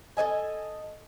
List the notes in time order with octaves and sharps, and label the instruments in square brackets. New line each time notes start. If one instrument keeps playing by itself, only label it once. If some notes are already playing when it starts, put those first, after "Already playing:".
[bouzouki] A4 C5 D#5 G#5